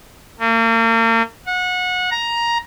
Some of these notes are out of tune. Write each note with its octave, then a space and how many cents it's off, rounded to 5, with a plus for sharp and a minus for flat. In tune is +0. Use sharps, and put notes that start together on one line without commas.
A#3 -40
F#5 -25
A#5 +10